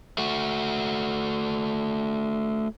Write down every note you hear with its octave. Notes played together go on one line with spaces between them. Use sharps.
A3 F#4